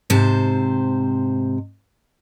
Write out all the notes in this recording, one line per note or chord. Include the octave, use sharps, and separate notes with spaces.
G#2 C3 C5 A5